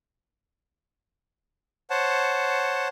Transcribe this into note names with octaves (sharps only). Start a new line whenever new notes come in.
C5 C#5 F#5 A5